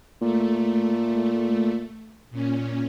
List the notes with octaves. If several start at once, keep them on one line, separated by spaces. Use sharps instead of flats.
A#2 A3
A#2 C#4